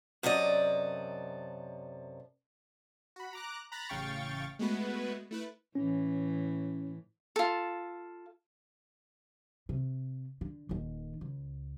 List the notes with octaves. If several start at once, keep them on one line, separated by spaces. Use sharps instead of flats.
F#2 C3 A4 D5 D#5
F#4 B5
A#5 D6 F#6
A#5 B5 F#6 A6
A1 C#3 F5 G5 C#6 A6
G#3 A3 B3 F#4 B4
A3 E4 B4
A2 E3 C#4
F4 A4
C3
D3
D#1 D#3
C#2